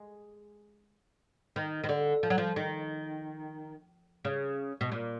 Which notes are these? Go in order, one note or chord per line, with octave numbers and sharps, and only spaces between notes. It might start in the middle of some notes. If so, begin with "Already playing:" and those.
Already playing: G#3
D#3
D#3
D3
F3
F#3
F3
D#3
C#3
B2
A#2